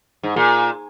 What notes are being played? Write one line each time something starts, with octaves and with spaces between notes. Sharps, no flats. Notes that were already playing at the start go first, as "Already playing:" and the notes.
G#2
A#2